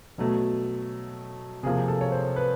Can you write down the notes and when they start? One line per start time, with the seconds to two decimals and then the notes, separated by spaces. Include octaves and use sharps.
0.18 B2 F#3 A3
1.63 C3 F3 A#3 G#4
1.88 A4
2.01 C#5
2.12 C5
2.36 B4